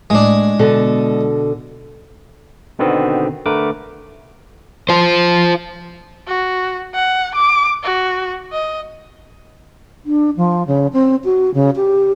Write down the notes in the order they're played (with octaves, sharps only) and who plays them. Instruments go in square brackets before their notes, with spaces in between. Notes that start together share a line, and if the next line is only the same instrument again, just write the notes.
[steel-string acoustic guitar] A2 [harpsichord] G#3 D4
[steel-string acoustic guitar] B2 D3 A4
[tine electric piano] B2 D3 D#3 B3 C4
D3 A3 A#4 B4 D6
[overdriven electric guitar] F4 C5
[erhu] F#4
F#5
D6
F#4
D#5
[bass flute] D4
F3
C#3
C4
F#4
C#3
G4